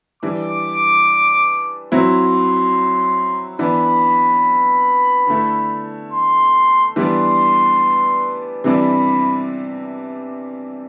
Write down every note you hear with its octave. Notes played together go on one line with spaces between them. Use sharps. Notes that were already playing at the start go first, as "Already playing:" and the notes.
E3 G3 D4 D6
F#3 C4 E4 C6
E3 B3 D4 B5
D3 A3 E4
C6
E3 G3 B3 D4 C6
C3 E3 G3 D4 B5